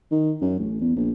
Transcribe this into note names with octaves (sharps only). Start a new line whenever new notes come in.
D#3
F#2
A1
E2
A#1